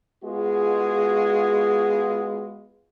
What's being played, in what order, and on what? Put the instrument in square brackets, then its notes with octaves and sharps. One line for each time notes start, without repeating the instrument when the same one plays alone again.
[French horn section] G#3 B3 F4 F#4 G#4